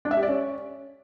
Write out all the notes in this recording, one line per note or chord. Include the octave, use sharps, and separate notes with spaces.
D4
E5
G4
D5
C#4